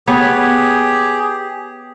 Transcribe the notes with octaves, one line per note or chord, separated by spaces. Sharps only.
B3 G4 G#4 B4 C#5